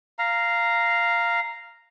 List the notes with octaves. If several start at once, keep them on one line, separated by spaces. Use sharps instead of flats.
F5 A#5